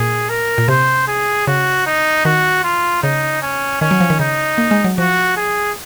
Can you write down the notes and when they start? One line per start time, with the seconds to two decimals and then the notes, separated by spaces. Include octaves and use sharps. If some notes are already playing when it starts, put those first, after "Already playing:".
Already playing: A#2 G#4
0.29 A#4
0.58 A#2
0.68 C3 C5
1.08 G#4
1.47 C#3 F#4
1.86 D#4
2.25 D#3 F#4
2.64 F4
3.03 C#3 D#4
3.42 C#4
3.81 D#3 C#4
3.91 F#3
4.00 F3
4.10 D#3
4.19 C#3 D#4
4.58 A#3
4.71 G#3
4.84 F#3
4.98 F3 F#4
5.37 G#4